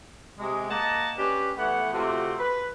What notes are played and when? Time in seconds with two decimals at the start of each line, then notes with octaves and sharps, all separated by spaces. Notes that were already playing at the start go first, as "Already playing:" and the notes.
0.39 C3 G#3
0.69 A#3 D#5 F#5 A5
1.18 C#4 D4 G4 B4
1.58 E3 A3 B3 F#5
1.93 C3 A3 C4 F4 F#4
2.39 B4